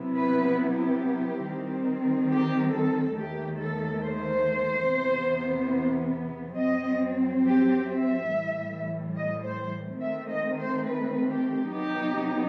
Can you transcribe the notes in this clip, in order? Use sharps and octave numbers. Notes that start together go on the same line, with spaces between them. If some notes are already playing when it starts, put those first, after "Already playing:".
Already playing: C3 F#3 B3 E4
B4
G4
D#3 G3 C4
G4
A4
D#2 D#3 A3 G4
A4
C5
E2 C3 E3 B3
F#2 F#3 C4 D#5
G4
E5
A2 E3 G3
D#5
C5
D#3 A3 C4 E5
D#5
C5
B4
G4
C3 F#3 B3 D#4 G4